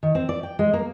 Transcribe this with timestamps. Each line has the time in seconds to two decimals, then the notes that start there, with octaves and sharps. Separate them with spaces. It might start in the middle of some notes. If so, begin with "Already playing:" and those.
0.03 D#3
0.15 C4
0.29 D5
0.43 G5
0.59 G#3
0.74 A#3